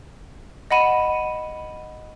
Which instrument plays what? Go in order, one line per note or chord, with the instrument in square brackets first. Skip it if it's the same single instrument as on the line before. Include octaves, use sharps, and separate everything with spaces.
[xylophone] D#5 F#5 B5 D#7 E7